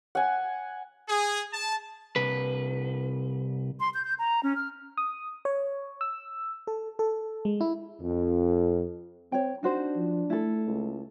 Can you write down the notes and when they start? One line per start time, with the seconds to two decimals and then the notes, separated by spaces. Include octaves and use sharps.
0.15 F#5 G#5
1.08 G#4
1.52 A5
2.16 C2 B4
3.80 C6
3.93 G6
4.05 G6
4.18 A#5
4.43 C#4
4.57 F6
4.97 D#6
5.45 C#5
6.01 E6
6.67 A4
6.99 A4
7.45 G#3
7.61 E4
8.01 F2
9.32 C4 C#5 G5
9.63 D4 D#4 F#4 C5
9.97 F3
10.30 A3 E4 A4
10.66 C#2